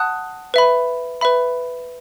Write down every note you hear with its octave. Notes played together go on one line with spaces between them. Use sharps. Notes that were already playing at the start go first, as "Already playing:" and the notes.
Already playing: F#5 A5 D#6 F#6
B4 E5 B5
B4 E5 B5